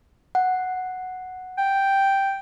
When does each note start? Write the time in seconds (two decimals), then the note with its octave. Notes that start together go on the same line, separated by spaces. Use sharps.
0.35 F#5
1.58 G5